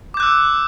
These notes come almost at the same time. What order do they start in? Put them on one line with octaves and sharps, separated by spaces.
D6 G6 F#6 E6